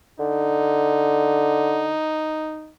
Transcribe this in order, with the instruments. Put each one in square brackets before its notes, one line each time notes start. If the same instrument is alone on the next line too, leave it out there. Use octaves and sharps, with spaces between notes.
[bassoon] D3 [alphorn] D#4